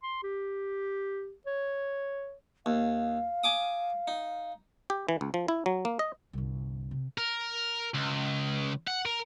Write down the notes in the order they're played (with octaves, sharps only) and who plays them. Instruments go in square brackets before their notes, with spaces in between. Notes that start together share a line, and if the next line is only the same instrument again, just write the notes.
[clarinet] C6
G4
C#5
[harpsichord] D#2 [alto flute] F5
[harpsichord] G#5 D6 D#6
D#4
[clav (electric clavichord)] G4
E3
C#2
F3
E4
F#3
A#3
D#5
[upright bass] G1 C2
C3
[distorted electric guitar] A#4
C#2
F#5
A#4